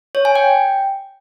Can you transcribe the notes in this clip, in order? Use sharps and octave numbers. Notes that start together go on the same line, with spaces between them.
C#5
G#5
G5